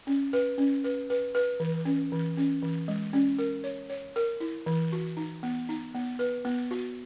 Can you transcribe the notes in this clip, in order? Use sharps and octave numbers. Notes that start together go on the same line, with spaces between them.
C#4
B4
C#4
B4
B4
B4
E3
C#4
E3
C#4
E3
G#3
C#4
A#4
C#5
C#5
A#4
E4
E3
F#4
D#4
B3
D#4
B3
B4
B3
F#4